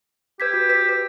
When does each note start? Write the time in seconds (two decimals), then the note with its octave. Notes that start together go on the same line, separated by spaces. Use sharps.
0.40 G4 B4 G#6 B6
0.54 F#4
0.69 B4 B6
0.89 B4